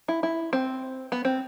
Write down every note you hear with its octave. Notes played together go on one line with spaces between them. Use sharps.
E4
E4
C4
B3
C4